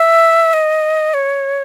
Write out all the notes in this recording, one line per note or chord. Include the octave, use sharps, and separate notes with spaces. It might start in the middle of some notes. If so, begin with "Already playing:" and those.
Already playing: E5
D#5
C#5